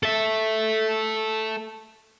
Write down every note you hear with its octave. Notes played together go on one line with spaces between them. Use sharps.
A4 E5